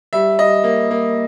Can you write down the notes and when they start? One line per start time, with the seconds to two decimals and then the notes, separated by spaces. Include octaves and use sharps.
0.13 G3 E5
0.39 G3 D#5
0.64 A#3
0.91 A#3